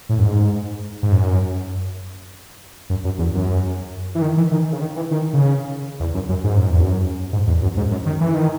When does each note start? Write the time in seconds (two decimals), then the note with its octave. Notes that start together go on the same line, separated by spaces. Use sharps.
0.09 A2
0.18 F#2
0.24 G#2
1.03 G#2
1.12 F#2
2.90 F#2
3.04 F#2
3.18 E2
3.34 F#2
4.15 E3
4.22 D#3
4.37 E3
4.52 D#3
4.72 C#3
4.81 D#3
4.96 E3
5.11 D#3
5.33 C#3
6.00 E2
6.14 F#2
6.29 F#2
6.44 G#2
6.56 F#2
6.70 E2
6.83 F#2
7.33 G#2
7.48 E2
7.62 F#2
7.77 G#2
7.91 F#2
8.06 D#3
8.21 E3
8.35 D#3